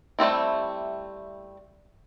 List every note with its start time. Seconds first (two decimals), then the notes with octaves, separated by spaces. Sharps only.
0.19 G3 A3 C4 E4